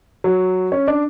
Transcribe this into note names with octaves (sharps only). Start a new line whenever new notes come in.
F#3
C#4
D4